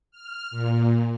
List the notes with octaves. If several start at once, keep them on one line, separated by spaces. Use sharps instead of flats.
F6
A#2